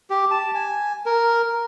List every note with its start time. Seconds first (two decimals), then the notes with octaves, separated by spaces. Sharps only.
0.10 G4
0.31 A5
0.55 G#5
1.06 A#4